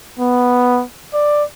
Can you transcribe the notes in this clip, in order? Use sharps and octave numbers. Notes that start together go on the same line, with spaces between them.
B3
D5